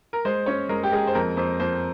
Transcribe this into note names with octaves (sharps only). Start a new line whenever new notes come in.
A#4
G#3 C5
C#4 C#5
G#3 A#4
G4
G#3 G#4
C5
F2 A#4
F2 C5
F2 C5